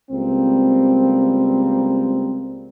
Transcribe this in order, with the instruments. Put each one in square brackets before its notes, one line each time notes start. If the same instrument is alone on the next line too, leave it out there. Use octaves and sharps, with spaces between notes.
[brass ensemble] C#2 G3 A#3 C4